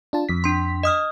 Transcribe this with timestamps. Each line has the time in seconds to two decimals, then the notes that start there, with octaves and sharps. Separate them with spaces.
0.13 D4 F4 A5
0.29 F2 B6
0.44 D4 C6
0.83 D#5 D#6 F6